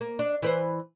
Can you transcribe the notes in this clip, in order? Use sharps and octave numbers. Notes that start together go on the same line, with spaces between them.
A#3
D4
E3 B4 C5